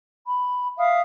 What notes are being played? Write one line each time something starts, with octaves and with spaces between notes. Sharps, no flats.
B5
E5 F5 D#6